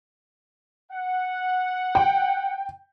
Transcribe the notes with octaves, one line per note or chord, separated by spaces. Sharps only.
F#5
G5